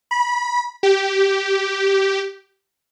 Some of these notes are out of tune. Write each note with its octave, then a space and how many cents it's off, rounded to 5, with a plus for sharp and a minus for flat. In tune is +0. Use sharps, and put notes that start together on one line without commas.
B5 -25
G4 -10